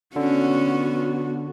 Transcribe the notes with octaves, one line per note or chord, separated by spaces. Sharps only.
D3 B3 C#4 F#4